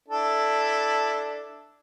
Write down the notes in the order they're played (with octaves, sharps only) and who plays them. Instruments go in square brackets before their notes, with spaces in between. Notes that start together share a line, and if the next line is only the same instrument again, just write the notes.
[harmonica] D4 E4 A4